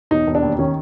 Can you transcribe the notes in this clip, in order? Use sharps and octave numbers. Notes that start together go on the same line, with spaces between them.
E1 D#4
E1
D4
D#2
D#3 C#4